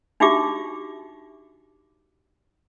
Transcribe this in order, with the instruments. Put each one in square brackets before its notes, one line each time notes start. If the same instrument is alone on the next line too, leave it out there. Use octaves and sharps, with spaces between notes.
[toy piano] D4 D#4 F#4 G4 E5 D6